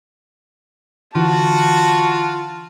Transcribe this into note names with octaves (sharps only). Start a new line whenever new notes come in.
D3 E3 F4 F#4 A5